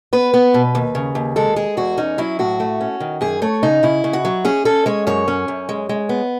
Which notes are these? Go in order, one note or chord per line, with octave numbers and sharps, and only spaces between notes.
B3 B4
B3
B2
D#2
C#3
D#2
G#3 A4
G#3 G#4
E2 F#4
C#4 D#4
F#3 E4
A2 F#4
A3
C#4
D#3
F#2 G#4
A3 C#5
C#3 D#4
C#3 E4
C#3
F#4
F#3
C#4 G#4
C#4 A4
G#3 C#5
F#2 C#5
C#4
F#2
G#3
G#3
B3